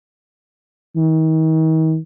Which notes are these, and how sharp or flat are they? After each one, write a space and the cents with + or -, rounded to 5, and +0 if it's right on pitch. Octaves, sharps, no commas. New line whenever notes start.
D#3 +40